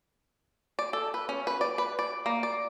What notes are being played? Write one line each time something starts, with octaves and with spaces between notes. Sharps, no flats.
D5
A4
B4
C#4
B4
D5
B4
D5
A#3
D5